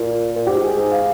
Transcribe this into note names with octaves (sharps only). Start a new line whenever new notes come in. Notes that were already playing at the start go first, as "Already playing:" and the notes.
Already playing: A#2 F4
A#2
G#2 G4
G#4
G#2 G#4
F5